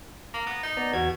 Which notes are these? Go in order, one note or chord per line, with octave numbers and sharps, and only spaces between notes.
A#3 A#5
B3
D#4
B3 D5 A#5
E2 B2 F#4 G#6